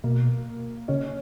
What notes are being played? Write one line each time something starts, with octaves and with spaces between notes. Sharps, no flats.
B2 A#3
C#3 C#4